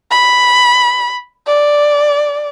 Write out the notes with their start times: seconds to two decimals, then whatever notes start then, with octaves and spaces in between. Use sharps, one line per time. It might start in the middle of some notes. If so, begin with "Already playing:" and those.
0.11 B5
1.47 D5